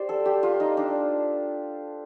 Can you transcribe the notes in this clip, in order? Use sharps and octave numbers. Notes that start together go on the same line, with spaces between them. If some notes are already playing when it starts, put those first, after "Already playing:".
Already playing: G4 C5 D5
A4
G4
F4
D#4
D4